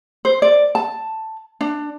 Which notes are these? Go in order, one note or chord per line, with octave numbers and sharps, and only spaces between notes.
C5
D5
A5
D4